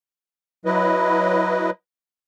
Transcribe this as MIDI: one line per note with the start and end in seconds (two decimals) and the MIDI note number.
0.65 1.70 54
0.65 1.70 64
0.65 1.70 71
0.65 1.70 75